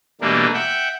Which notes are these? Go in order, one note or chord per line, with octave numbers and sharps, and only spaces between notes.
B2 E3 G3 A3 A#3 D4
E5 F#5 G5